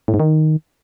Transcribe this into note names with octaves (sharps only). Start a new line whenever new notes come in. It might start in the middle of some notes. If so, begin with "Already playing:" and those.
A2
G#2
D#3